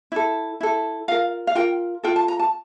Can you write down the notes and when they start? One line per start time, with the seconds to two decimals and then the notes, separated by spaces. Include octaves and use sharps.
0.12 E4 A4
0.61 E4 A4
1.08 F4 A#4 F5
1.47 F5
1.55 F4 A#4 G5
2.03 F4 A4 G5
2.16 A5
2.28 A#5
2.39 A5